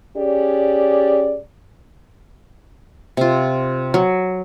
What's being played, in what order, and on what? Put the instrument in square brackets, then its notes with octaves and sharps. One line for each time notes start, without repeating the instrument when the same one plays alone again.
[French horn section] C#4 G4 G#4 D5
[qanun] C3 F4
F#3